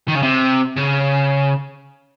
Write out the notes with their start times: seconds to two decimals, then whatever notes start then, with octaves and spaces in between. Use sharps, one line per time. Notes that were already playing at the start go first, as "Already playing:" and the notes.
0.08 D#3
0.15 C#3
0.22 C3
0.76 C#3